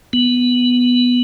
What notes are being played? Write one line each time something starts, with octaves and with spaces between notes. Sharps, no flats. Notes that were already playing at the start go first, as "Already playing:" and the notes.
B3